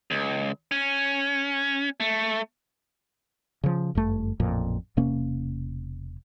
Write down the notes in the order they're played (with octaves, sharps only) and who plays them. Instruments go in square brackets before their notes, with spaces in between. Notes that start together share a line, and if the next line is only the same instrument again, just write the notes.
[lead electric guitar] C#2
C#4
A3
[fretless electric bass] C#3 F3
G1 F#2 A3
A1 F2 A#2
E1 C3 A#3 C#4